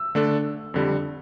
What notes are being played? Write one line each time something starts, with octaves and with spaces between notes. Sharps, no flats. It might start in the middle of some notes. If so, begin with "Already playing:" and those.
Already playing: E6
D3 A3 D4 A4
F2 D3 G3